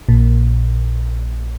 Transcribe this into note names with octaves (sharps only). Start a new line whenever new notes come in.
A#1 A#2